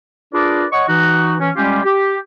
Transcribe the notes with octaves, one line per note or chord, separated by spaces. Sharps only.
D4 F4 G#4 A#4 B4 D5
C#5 D#5 F#5 C#6
E3 D#4 F#4
E3 C#4
G3 G#3 C#4 F4 G4
G4